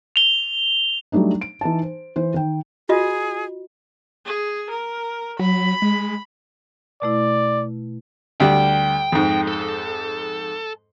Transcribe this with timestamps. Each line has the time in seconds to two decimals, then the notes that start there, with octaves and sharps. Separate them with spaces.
0.16 F7 G7
1.12 F#3 G3 A3 D4 D#4
1.41 D7
1.61 E3 D#4 A5
1.83 C5
2.16 E3 C5
2.34 D#3 G5
2.89 F4 F#4 G#4 D#5
4.26 G#4
4.70 A#4
5.39 F#3 B5
5.82 G#3
7.02 B2 A3 E4 D5
8.40 D2 G3 G5
9.12 F2 G#2
9.48 A4